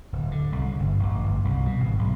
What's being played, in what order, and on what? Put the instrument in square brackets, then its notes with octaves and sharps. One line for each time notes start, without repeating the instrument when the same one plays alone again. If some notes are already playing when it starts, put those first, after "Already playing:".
[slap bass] D1
D3
C2
C#3
G1
A1
G1
C2
B2
G#1
B1